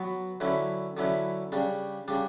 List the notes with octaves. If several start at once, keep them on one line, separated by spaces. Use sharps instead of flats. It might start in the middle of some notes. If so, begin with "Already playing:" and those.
Already playing: F#3 B3 F#4 B4
D3 F#3 C#4 E4 B4
D3 F#3 C#4 E4 B4
C#3 G3 D4
C#3 G3 D4